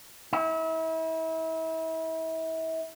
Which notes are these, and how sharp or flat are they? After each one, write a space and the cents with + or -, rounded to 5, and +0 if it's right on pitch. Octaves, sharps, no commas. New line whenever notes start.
E4 -35